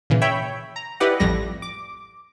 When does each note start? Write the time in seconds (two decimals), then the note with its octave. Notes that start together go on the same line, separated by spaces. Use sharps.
0.10 A#2 C#3 E3
0.21 C#5 E5 G5 B5
0.76 A#5
1.00 E4 G4 B4 D5 D#5 F#5
1.20 A1 F2 G3 A#6
1.62 D6